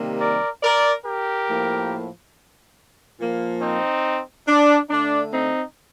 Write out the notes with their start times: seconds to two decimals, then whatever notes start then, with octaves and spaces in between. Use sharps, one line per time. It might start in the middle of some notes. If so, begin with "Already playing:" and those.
Already playing: C3 D#3 G3 A#3
0.20 A#4 D5
0.63 A#4 D5
1.05 G4 A#4
1.48 A2 F3 A#3
3.19 A#2 F3 A#3
3.62 C4 D#4
4.48 D4
4.90 D3 A3 D4
5.32 C4 D#4